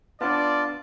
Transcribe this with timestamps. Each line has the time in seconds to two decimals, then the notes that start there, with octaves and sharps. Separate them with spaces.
0.21 B3 D4 F4 D5 A5